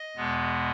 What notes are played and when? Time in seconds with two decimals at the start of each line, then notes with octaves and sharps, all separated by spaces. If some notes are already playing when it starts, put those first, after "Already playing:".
Already playing: D#5
0.17 E2 B2 G#3 B3